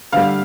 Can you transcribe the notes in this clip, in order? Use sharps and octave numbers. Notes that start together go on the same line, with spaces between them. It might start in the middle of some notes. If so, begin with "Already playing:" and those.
D3 G3 F5